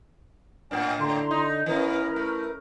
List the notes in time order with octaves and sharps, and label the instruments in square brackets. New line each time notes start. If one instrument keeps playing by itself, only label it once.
[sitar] A2 A#3 D4 [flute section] F#5 G#5 F6
[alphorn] D3 [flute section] E4 A#5 C6
[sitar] D#4
[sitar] E3 B3 C#4 [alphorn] E4 [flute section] A#4 B4
[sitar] A3